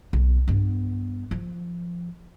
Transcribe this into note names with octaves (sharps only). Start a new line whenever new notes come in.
B1
G2 B3
F3